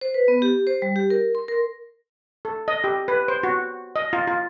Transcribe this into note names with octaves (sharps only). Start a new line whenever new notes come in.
C5
B4
B3
G4
C5
G3
G4
A#4
C6
A#4
A4
D#5
G4
B4
C5
F#4
D#5
F4
F4